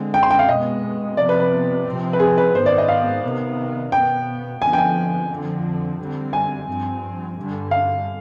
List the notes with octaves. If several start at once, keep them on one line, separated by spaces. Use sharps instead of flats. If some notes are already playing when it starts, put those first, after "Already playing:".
Already playing: D3 G#3 C4
G5
C6
G5
F5
B2 G#3 B3 D#5
C3 F3 B3 D5
B4
B4
C3 F3 C4
B4
G#4
B4
G#2 D#3 B3 C5
D5
D#5
F5
C3 D#3 B3
B2 B3 G5
D3 F3 B3 G#5
G5
G#5
F2 D3 F3 C4
D3 G3 C4
G#5
G2 F3 C4
G2 D3 G3
F5